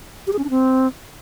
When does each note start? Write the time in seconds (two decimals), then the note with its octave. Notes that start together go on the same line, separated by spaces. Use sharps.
0.27 G4
0.33 G#4
0.39 C#4
0.44 D4
0.50 C4